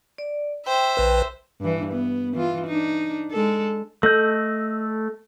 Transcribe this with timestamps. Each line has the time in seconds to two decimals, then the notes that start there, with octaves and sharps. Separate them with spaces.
0.18 D5
0.67 C5 E5 G5
0.97 A#1 B4
1.61 G2 E3
1.93 B3
2.33 E3 F4
2.67 D4 D#4
3.32 G#3 A4
4.03 A3 A4 D#5 G6